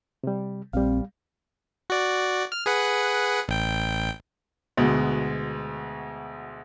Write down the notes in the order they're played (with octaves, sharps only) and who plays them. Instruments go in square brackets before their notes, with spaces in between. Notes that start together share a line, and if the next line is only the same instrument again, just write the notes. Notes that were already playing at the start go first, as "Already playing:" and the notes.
[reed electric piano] C3 G3
[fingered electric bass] A#1 [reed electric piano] G3 F5 [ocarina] C4
[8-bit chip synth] F#4 D5
F6
G#4 B4 F#5
A1 G5
[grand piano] D2 B2 G#3